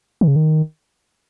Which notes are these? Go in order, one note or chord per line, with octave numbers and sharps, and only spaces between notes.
D#3
C#3
D#3